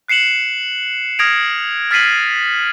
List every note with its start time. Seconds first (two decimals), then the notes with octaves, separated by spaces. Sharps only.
0.08 F#6 C7 C#7 E7 F#7
1.19 D#6 F6 G#6 A#6 D7 F7
1.91 F6 A6 B6 C7 D#7 F#7